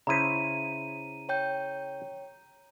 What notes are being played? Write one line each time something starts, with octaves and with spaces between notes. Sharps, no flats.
C#3 E4 C5 A#5 D#7
C#5 G5 G6